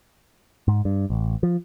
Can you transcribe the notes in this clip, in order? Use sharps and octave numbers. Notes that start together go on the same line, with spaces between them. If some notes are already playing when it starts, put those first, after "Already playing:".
G#2
G2
A1
F3